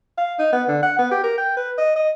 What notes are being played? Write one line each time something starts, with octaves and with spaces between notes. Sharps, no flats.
F5
D#4
B3
D3
F#5
B3
G4
A#4
G5
B4
D#5
D#5